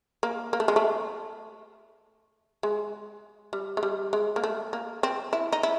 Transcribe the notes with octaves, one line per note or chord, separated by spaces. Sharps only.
A#3
A#3
A3
G#3
A3
G#3
G3
G#3
G3
G#3
A#3
A3
A#3
C4
E4
D#4
E4